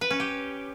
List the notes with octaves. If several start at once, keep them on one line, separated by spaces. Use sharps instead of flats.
B4
C#4
G4